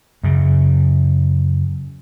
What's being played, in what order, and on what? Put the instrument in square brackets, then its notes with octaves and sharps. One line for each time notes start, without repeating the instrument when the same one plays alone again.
[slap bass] F#2 C#3